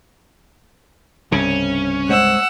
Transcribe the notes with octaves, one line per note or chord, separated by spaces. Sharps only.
C2 G2 C#3 C#4
G#3 C5 C#5 F#5 E6